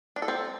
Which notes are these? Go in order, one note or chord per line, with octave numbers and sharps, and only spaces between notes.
D4
A4
C4